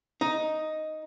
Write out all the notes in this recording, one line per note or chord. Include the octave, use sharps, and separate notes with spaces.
D#4